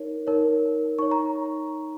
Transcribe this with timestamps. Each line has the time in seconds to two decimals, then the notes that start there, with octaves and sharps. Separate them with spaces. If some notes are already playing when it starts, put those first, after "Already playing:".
Already playing: D#4 A#4 C#5
0.27 D#4 A#4 C#5
0.99 D#4 C#5 C#6
1.11 A#5